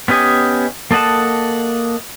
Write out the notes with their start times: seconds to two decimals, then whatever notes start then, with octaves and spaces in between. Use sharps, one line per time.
0.08 B3 C#4 G4 D#5 G#5
0.91 A#3 A4 D#5 F#5 A5